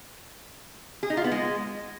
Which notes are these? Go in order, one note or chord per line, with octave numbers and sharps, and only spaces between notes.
G#4
D#4
F4
B3
G#3